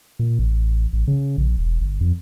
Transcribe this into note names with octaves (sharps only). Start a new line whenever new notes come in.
A#2
A1
A1
C#3
A#1
E1
G1
F2